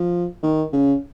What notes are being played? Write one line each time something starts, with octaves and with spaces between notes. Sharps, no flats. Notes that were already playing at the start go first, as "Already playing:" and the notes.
Already playing: F3
D#3
C#3